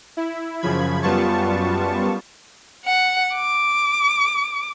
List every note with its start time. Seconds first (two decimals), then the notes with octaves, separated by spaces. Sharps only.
0.17 E4
0.61 F#2 C#3 F3 B5 G#6
1.02 F#2 G3 B3 F4 A5 C#6
2.85 F#5
3.36 D6